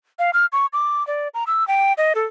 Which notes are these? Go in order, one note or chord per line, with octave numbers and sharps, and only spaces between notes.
F5
F6
C#6
D6
D5
A#5
E6
G5
D#5
A4